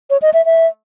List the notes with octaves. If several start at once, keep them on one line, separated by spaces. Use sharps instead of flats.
C#5
D#5
E5
E5